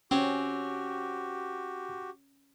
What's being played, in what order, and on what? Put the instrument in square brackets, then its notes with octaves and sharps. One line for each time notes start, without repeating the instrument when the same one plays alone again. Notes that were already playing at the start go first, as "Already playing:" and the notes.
[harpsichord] C4 C#5 [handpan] C#4 [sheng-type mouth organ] F#4 G4